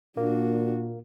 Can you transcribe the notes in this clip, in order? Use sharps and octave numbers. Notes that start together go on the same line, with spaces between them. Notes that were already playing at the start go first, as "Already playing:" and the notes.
A#2 A#3 D4 F#4